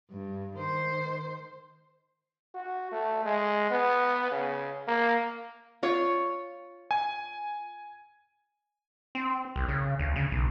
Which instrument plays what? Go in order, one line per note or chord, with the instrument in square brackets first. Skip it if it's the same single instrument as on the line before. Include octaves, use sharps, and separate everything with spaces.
[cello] G2
D#3 C5
[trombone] F#4
A3
G#3
B3
C#3
A#3
[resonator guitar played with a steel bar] F4 C#5
[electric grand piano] G#5
[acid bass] C4
C2
C#3
D2
C#3
B1